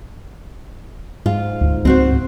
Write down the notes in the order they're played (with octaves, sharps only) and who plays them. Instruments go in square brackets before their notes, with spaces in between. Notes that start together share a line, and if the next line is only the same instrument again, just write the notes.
[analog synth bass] G#2 [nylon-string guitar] F4
[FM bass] D2
[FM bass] C#2 [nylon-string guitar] C4 F#4 C5